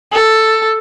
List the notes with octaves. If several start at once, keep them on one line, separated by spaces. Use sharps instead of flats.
A4